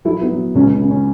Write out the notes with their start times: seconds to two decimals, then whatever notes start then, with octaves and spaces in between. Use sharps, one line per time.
0.05 F#3 E4 A4
0.21 B3 E4
0.31 F#3
0.55 C#2 C#4
0.73 C#4
0.81 C#3
0.90 C#4